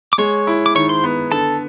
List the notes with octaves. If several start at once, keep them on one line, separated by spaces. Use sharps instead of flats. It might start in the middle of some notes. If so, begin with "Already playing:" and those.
D6
G#3 C#5 C#6
E4
D6
D#3 C#5 C#6
C5 C6
B3
D3 A4 A5